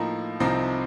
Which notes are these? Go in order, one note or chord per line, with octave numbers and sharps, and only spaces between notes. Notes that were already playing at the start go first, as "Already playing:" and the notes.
Already playing: A2 F3 A#3 D#4
C2 C3 F3 C4 D#4